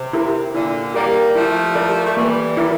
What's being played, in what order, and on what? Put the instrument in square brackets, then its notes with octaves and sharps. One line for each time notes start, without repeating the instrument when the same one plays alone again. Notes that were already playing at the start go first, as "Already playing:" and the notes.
Already playing: [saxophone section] C3
[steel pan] E4 G4 A#4
[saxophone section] A#2 D3 [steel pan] E4
[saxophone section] G3 A#3 [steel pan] G4 A#4 D5
[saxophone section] F3 A3 [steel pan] E4
[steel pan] G4 A#4 D5
[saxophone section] A#3
A3
[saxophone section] E3 G3 [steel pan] A#3
[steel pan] E4 A#4 D5